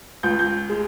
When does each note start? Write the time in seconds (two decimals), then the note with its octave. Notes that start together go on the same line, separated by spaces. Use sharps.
0.23 C#2 G6
0.39 G6
0.70 G#3